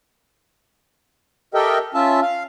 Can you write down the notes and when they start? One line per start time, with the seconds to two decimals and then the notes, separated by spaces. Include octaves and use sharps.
1.54 G4 A4 A#4 D#5 E5 G5
1.94 C#4 F4 E5 A5
2.22 F5